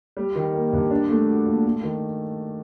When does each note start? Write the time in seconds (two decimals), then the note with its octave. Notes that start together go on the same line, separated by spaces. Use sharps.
0.17 G3
0.35 D#3
0.54 A#3
0.73 G2
0.91 D4
1.09 A3
1.28 F#4
1.46 A#2
1.65 A3
1.83 D#3